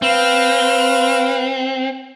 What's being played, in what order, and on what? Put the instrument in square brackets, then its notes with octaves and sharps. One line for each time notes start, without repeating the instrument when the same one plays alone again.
[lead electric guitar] C4 [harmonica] B4 F5